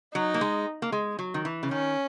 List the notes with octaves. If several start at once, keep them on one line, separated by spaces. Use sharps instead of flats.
F#3 D#4
A#3
G#3
A#3
G#3
F#3
D#3
E3
C#3
D#3 C#4